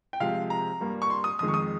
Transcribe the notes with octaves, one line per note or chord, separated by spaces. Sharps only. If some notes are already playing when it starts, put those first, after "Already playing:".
G5
C3 F3 G#3 F5
A#5
G2 G3 A#3
C#6
C6
D#6
F2 D#3 G#3 D#6
C#6
D#6